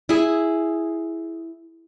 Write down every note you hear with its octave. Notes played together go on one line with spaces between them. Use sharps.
E4 G#4